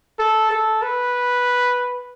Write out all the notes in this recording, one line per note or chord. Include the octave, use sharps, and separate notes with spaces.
A4
A4
B4